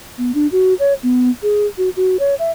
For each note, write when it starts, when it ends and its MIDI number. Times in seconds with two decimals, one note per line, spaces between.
0.18 0.31 59
0.35 0.47 62
0.52 0.74 66
0.79 0.94 73
1.03 1.30 59
1.43 1.67 68
1.78 1.89 66
1.97 2.17 66
2.20 2.35 73
2.39 2.51 76